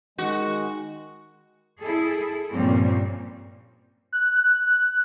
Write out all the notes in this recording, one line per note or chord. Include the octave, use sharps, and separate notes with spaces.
D#3 G#3 F#4
E4 G#4 A4
G2 A#2 F3 G3 C4 C#4
F#6
F#6